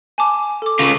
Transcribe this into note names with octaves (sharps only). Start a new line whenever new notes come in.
G#5 A5 D6
A4 D6
C#3 F4